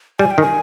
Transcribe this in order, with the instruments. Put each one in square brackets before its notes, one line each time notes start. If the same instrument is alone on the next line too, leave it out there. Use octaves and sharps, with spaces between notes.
[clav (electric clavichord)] G3 [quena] G#5
[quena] G5
[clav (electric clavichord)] D#3
[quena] G#5